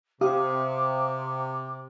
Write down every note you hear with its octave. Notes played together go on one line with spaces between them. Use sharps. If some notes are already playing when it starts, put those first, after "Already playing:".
C3 G4 F5 D6 D#6